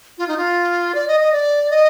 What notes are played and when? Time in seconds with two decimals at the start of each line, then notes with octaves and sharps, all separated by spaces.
0.18 F4
0.28 D#4
0.37 F4
0.95 D5
1.08 D#5
1.20 D#5
1.32 D5
1.70 D#5